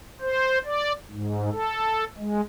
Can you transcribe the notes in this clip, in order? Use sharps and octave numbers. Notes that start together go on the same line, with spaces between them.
C5
D5
G#2
A4
G#3